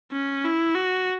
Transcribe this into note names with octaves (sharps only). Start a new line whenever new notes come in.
C#4
E4
F#4